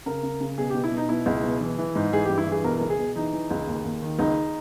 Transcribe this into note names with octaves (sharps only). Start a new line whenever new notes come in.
C#3 A#4
C#3
C#3
B2 G#4
G4
B2
E4
B2
D#4
B2 E4
C#2
B2
E3
E3
G#2
E3 G#4
G2 G4
E4
E3
G#4
B2 A#4
C#2 A#4
G#4
B2
E3 D#4
E3
C#2
D#2
D#2
D#3
C#2 D#4